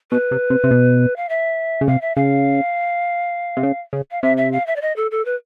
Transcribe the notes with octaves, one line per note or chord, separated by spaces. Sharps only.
B2 B4
C3
C3
C3
B2
F5
E5
C#3
C3 F5
E5
C#3 F5
C3
C#3
C#3
F5
C3 E5
E5
F5
E5
D5
D#5
A4
A4
B4